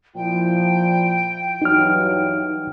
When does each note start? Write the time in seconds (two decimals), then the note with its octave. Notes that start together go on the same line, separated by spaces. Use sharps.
0.16 A#2 F3 E4 G5
1.62 G2 E3 F#3 D#4 F6